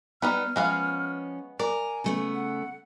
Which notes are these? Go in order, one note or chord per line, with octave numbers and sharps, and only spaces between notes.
G3 B3 D#4 B4 F6
F3 G#3 B3 C#4 F5
A#4 D5 G#5
C#3 A3 B3
F#5